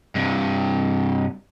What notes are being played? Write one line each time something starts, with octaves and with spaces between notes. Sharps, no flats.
G2 C3